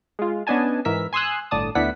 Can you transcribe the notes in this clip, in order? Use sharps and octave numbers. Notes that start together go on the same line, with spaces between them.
G#3 F4
B3 C#4 D4 D#5 G#5 A5
G#2 E3 A#4 E5 B6
G#5 C6 D#6 E6 F#6
G1 A2 D3 D5 A5 D#6
D2 B3 D4 E4 F#5 B6